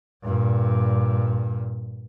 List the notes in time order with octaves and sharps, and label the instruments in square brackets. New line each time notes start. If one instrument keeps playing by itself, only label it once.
[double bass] G2 A#2